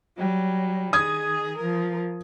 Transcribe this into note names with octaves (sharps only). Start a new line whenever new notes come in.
F#3 G3
D#3 G#4 D#6 G#6
F3 A#4